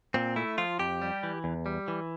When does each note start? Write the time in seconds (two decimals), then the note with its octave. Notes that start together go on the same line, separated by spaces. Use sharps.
0.14 A#2 C4
0.36 A3 E4
0.58 F3 F4
0.79 F2 G4
1.02 G3
1.23 E3
1.44 E2
1.66 G3
1.88 E3